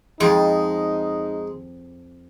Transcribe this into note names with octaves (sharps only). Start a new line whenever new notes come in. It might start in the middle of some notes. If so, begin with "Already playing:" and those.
F2 G#3 D#4